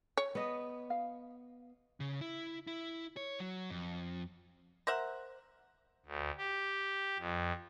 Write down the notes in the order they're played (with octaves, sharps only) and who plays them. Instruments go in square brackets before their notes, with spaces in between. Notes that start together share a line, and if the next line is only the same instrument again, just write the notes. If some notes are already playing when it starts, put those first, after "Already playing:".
[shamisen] C#5
[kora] B3 D#5
[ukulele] F5
[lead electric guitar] C#3
E4
E4
C#5
F#3
F2
[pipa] A#4 C5 E5 F#5
[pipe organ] D2
G4
F2